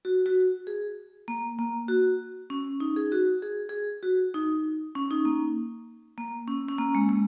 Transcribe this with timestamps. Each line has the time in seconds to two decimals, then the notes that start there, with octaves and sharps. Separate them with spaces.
0.05 F#4
0.26 F#4
0.67 G#4
1.28 A#3
1.59 A#3
1.88 F#4
2.50 C#4
2.80 D#4
2.96 G#4
3.12 F#4
3.42 G#4
3.69 G#4
4.03 F#4
4.34 D#4
4.95 C#4
5.11 D#4
5.25 A#3
6.18 A#3
6.48 C#4
6.68 C#4
6.78 A#3
6.95 G#3
7.09 G#3